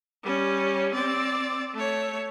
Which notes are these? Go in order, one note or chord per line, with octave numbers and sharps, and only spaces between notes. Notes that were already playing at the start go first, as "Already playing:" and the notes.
G3 C#4
C4 D5
A3 C#5